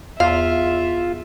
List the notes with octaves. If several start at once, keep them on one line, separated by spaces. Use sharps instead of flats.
E2 F4 E5 F5